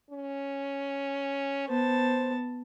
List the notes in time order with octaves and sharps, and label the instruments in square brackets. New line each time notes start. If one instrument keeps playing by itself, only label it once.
[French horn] C#4
[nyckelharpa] B3 A5 [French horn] C5